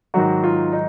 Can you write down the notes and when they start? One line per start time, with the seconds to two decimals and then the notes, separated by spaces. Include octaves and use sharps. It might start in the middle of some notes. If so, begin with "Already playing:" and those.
0.14 G#2 D#3 F#3 F#4
0.44 F4
0.72 D#4